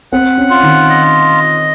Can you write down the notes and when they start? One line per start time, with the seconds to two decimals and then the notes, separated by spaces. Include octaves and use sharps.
0.13 C4 F#5
0.38 C#4
0.50 F4
0.63 D#3
0.89 D#5